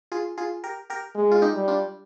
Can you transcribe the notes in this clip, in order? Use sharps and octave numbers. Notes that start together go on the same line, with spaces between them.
F4 G#4
F4 G#4
G4 A#4
G4 A#4
G#3
F4
D#4 G4
G3
D4 F4